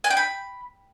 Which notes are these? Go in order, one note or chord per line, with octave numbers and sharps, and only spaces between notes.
G#5
G5
B5